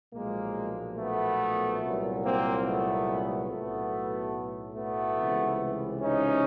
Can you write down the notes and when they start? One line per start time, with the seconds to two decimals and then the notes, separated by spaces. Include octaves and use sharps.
0.13 B1 A#2 F3 G#3 A#3
0.97 A3 B3
1.82 C2 A#2 F#3
2.23 A#3 C4
2.66 A3 B3
3.49 B1 A2 F#3 A3 B3
4.76 A3 B3
5.18 C#2 C3 E3
6.02 C#4 D#4